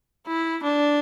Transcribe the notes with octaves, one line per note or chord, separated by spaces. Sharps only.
E4
D4